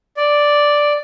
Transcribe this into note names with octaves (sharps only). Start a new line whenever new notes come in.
D5